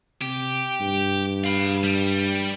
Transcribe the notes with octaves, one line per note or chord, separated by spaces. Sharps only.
C3 G4
G2
F5 B5
G3